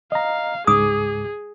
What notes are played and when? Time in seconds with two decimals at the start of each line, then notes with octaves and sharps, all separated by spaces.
0.12 D#5 F5 A#5
0.67 C#2 G#2 G#4 D6 D#6